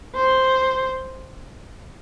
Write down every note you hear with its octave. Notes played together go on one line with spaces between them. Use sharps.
C5